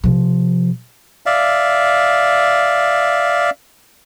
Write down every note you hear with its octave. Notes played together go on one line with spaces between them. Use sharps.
C3 F3
D5 E5 F5